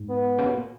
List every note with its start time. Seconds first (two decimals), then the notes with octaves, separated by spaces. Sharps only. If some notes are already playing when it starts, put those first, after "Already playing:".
Already playing: G#2
0.09 B3
0.38 C#3
0.45 B2
0.53 A#2